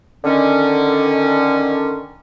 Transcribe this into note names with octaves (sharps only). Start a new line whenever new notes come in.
D3 D#3 C#4